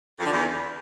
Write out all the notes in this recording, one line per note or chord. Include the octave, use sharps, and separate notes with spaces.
F2
D3
E2